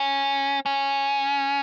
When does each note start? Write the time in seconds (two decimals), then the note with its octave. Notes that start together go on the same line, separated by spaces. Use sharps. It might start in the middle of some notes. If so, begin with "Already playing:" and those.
Already playing: C#4
0.66 C#4